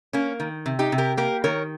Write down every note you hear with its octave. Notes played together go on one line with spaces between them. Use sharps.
A#3 C#4
D#3
C3
D#4 G4
C3
G4 A#4
A#3 G4 A#4
D#3 A#4 C#5